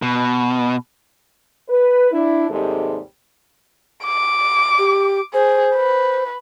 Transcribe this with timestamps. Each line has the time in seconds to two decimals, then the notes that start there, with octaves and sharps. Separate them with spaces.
0.02 B2
1.69 B4
2.12 D4 E4
2.50 D#2 G#2 C3 G3 G#3 A4
4.05 D6
4.79 G4
5.34 G#4 C5
5.76 B4